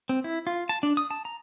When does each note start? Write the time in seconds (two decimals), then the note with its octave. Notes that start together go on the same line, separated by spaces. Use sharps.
0.09 C4
0.24 E4
0.47 F4
0.69 A5
0.83 D4
0.97 D#6
1.11 A5
1.25 A#5